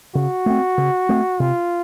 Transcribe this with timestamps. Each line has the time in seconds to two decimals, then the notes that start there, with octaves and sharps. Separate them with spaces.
0.15 C#3 F#4
0.46 A3 C4
0.78 C#3
1.09 A3 C4
1.40 C3 F4